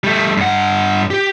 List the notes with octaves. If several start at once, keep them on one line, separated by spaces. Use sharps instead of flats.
G3 A3
G2 F#5
G4